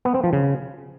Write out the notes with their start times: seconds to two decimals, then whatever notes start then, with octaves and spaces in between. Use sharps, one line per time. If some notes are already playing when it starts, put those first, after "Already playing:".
0.05 B3
0.14 C4
0.24 F3
0.33 C#3